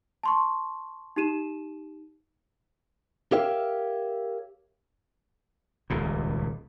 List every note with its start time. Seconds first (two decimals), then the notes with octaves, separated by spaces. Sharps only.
0.23 A5 C6 C#6
1.16 D#4 G4 D#7 E7
3.32 G4 A#4 C#5 E5 F5 G5
5.90 D#1 C#2 A#2